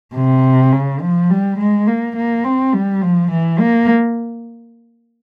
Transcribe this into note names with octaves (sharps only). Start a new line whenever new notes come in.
C3
C#3
F3
G3
G#3
A#3
A#3
C4
G3
F3
E3
A#3